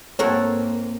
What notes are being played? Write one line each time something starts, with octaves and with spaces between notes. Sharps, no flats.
G#2 A#3 C4 A4 A#4 C#5 F#5